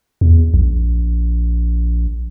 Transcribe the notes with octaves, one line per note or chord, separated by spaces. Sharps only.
E2
A#1